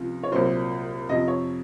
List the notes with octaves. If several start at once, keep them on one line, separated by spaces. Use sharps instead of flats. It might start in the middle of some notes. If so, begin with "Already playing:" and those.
Already playing: C#2 C3 F3
C#5
C2 A#2 F#3 C5
F2 C3 F3 D#5
C#5